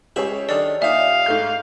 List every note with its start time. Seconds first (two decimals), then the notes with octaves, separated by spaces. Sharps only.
0.16 C#2 G4 G#4 C#5 E5 B5
0.49 D#3 D4 A4 D5
0.82 A#2 D#4 E5 F5
1.26 G#2 A3 G6